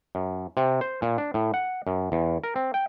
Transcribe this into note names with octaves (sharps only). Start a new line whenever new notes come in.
F#2
C3
C5
A#2
D4
A2
F#5
F#2
E2
A#4
C4
G5